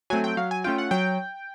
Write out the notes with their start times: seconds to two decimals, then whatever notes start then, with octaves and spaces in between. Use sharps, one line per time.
0.10 F#3 A3 C4 G#5
0.24 G5
0.37 F#3 F5
0.51 G#5
0.64 A3 C#4 F4 G5
0.78 F#5
0.91 F#3 G5